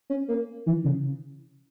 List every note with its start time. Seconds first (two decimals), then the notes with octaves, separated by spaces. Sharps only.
0.10 C#4
0.28 A#3
0.66 E3
0.84 C#3